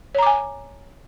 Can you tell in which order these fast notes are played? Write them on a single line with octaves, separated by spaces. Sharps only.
C#5 A#5 D6 G#5